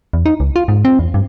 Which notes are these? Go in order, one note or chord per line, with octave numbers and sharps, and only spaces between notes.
E2
D#4
C#2
F4
G#2
C4
E2
G2